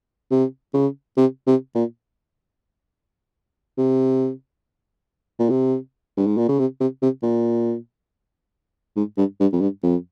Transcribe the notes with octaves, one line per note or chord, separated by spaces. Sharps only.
C3
C#3
C3
C3
A#2
C3
A#2
C3
G2
G#2
A#2
C#3
C3
C3
C3
A#2
G#2
G2
G2
F2
G2
F2